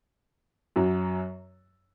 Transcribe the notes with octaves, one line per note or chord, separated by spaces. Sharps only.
F#2 F#3